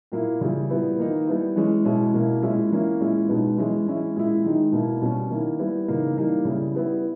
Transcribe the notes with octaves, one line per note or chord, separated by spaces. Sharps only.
A#2 A#3 E4
C#3 E3 G3 C#4 E4
A#2 G3 B3 E4
D#3 A#3 D#4
G3 B3 E4
E3 G#3 C#4
B2 G#3 C#4 E4
B2 A#3 E4
A#2 G#3 C#4 E4
E3 A#3 C#4 E4
A#2 G#3 C#4 E4
B2 G#3 B3 D#4
E3 G#3 C#4 E4
E3 G#3 C#4 E4
A#2 G#3 C#4 E4
D#3 G#3 D#4
B2 A#3 E4
B2 G3 C#4
D#3 A#3 E4
G3 B3 E4
C#3 E3 A#3 D#4
E3 G3 A#3 D#4
C#3 G3 C#4 E4
G3 B3 E4